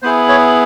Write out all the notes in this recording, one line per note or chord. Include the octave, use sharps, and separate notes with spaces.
B3 E4 G#4 C5
C#5